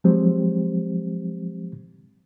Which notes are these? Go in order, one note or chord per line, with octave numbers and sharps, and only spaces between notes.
F3 F#3 G#3 C4 G4 C5